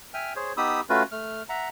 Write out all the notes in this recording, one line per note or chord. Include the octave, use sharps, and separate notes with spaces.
E5 G5 G#5 F6
G#4 C5 C#5
B3 D#4 G4 B5 D#6 E6
A3 C#4 F4 F#4 B4
A3 F6
E5 F#5 A#5